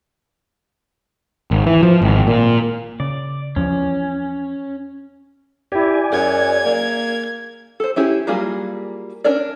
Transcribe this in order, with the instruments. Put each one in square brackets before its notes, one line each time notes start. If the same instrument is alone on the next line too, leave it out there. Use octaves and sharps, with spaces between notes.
[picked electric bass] G#1
E3
F3
G#1
A#2
[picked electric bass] C#3 [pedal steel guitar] D5
[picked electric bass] E2 F3 [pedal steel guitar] C#4
[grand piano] E4 G4 [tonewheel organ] D5 G#5
[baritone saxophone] F#2 [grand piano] G#4 [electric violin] G#6
[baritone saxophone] A#3
[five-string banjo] A4 C5
C#4 E4 G4 G#4
F#3 G3 A#3 F4 G#4
C#4 D4 A#4 C#5 D5